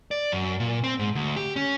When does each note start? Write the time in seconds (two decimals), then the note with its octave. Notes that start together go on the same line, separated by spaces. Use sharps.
0.11 D5
0.32 F#2
0.60 A#2
0.84 C4
0.99 G#2
1.15 D2
1.36 G4
1.56 C#4